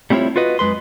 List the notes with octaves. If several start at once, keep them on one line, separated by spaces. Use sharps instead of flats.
G3 A3 C4 E4 F4 C#5
F4 F#4 B4 D#5
F#2 G#3 B4 C6